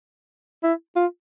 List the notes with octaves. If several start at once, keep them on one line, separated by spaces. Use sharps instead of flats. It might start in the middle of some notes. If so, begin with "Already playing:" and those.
E4
F4